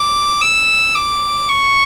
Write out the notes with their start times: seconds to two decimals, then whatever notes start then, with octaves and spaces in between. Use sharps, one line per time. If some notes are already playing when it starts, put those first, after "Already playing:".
Already playing: D6
0.42 E6
0.95 D6
1.49 C#6